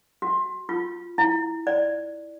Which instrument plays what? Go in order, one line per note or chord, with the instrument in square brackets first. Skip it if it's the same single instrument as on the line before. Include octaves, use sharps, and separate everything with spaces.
[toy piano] F#4
F4
E4
D5